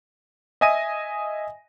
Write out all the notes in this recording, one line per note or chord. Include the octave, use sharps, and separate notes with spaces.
D#5 E5 G#5 D#6 A#6 D#7